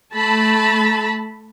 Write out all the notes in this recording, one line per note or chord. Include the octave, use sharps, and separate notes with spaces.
A3 A5 B5